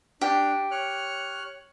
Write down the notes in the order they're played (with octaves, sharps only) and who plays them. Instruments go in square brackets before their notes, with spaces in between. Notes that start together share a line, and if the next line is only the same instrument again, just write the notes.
[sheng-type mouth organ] D4 [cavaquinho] G4
[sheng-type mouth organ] C#5 F6 F#6